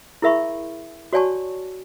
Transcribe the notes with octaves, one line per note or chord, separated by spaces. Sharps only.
E4 G#4 A#4 E5 B5 C#6
F#4 C#5 D5 G#5 A5 C#6